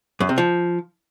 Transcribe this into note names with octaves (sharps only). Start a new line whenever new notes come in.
F#2
C3
F3